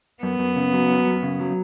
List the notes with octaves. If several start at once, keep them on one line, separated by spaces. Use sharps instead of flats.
F#2 B3
F#2
C#3
F#3
F#2
F#2
C#3
F#3